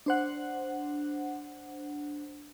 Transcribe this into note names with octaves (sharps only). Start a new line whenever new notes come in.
D4 C5 F#5